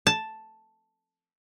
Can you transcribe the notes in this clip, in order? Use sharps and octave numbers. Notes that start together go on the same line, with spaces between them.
A5